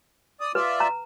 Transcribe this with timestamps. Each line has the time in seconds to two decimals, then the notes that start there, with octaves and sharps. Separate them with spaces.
0.41 D5 D#6
0.55 F4 B4 D5 E5
0.80 A#5